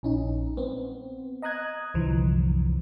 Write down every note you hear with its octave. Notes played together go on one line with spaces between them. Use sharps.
A#1 C#4 D#4
B3 C4
D#5 A#5 D#6 F#6 G#6
C2 F#2 D3 E3 F3